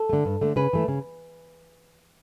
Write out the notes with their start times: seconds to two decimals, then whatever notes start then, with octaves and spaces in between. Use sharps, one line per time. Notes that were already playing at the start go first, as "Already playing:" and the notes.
Already playing: A4
0.09 D3 A3
0.25 G2
0.41 D3 A3
0.56 C#3 B4
0.73 E3 A3
0.88 C#3